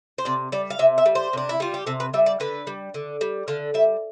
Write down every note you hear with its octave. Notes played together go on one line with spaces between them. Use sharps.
C5
C3 D5
G3 D5
F5
C3 E5
E5
G3
C5
C3 D4
E4
G3 F4
G4
C3 A4
B4
G3 E5
D5
D3 B4
G3
D3
G3
D3 F5
G3 E5